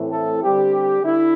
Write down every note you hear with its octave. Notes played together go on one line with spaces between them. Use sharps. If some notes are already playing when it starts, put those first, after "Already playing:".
Already playing: A2 E3 A3 C4
A4
D3 G3 C4 G4
D3 E4